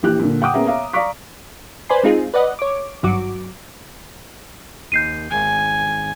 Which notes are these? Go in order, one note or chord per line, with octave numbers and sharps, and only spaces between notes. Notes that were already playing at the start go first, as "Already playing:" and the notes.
A#1 E3 G4 F#6
A#2 D3
F#5 G5 D6 D#6
A#3 B3 C#4 G#4 E5 A#5
C#5 E5 F5 A#5
D5 F5 A#5 C#6 D6 B6
B4 C5 D5 G#5 B5 C6
G#3 C4 D#4 F4 G#4
B4 D5 D#5 F#5
C#5 D6
G#1 G2 F#3 F#4 D6
D#2 G6 C7 D#7
G#1 G#5